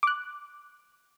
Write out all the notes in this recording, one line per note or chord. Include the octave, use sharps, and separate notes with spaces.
D6 F#6